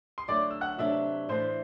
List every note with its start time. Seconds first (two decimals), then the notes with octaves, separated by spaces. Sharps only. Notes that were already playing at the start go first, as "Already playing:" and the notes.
0.18 C6
0.28 D3 F#3 A3 D5 D6
0.51 E6
0.61 F#5 F#6
0.78 C3 F#3 A3 D4 E5 E6
1.29 A2 E3 A3 D4 C5 C6